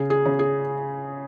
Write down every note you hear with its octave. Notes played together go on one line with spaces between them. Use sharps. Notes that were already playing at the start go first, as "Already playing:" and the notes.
Already playing: C#3 G#4
G#4
C#3
G#4